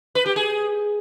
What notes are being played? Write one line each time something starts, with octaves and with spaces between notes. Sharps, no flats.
B4
G4
G#4